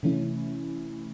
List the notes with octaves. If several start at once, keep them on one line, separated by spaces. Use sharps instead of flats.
C3 E3 A3 C#4 E4